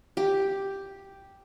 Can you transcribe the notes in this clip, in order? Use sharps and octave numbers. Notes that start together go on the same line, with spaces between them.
G4